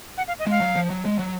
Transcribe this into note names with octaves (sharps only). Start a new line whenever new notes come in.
F#5
F5
D#5
G#3 F5
F#3
F3
F#3
G#3
F#3